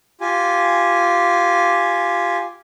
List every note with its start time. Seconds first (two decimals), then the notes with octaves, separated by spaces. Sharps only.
0.21 F4 G4 G#5